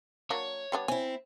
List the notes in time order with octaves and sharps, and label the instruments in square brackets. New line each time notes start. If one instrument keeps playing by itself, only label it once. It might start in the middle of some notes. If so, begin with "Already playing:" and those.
[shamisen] F#3 A#3 D4 [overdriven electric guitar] C#5
[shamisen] G3 B3 D4
[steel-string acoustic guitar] C4 E4 [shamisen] G#5